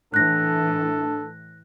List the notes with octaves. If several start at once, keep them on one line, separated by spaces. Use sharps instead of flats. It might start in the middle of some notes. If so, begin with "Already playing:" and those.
A2 E3 D4 A4 F#6 A#6